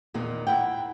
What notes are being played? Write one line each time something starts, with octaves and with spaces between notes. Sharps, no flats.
E2 A#2 D#3 A#3
D#2 E4 F#5 G5